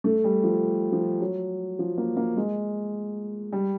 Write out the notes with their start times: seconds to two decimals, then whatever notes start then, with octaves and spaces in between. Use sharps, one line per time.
0.04 A3
0.24 G3
0.44 F3
0.92 F3
1.21 F#3
1.79 F3
1.98 A#3
2.17 A#3
2.37 G#3
3.53 G3